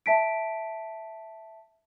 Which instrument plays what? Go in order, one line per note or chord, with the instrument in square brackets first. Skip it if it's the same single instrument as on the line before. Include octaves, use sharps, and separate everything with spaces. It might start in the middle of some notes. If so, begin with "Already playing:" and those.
[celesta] E5 A5 B6 D7